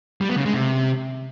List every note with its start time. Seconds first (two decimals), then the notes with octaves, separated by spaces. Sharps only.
0.21 G3
0.29 B3
0.37 C#3
0.45 G#3
0.53 C3